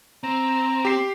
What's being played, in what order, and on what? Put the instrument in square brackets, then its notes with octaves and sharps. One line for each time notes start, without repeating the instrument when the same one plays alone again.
[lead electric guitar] C4 [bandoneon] A#5
[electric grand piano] G4 C7